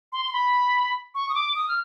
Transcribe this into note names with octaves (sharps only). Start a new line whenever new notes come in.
C6
C6
B5
C#6
D#6
D6
D#6
F6